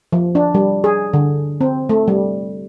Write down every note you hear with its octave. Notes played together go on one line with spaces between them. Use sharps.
F3
D4
G3
G#4
D3
C4
A3
G3